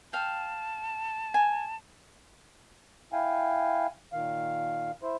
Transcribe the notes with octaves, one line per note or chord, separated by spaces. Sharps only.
F5 G5 A5
G#5
E4 F5 G5 G#5
A#2 D#3 F5
E4 C5